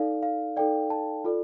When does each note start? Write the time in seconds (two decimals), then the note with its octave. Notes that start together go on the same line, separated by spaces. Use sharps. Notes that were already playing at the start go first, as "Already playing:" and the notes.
Already playing: D#4 A4 D5 F5
0.23 F5
0.57 D#4 A4 D5 G5
0.90 A5
1.24 F4 A4 D5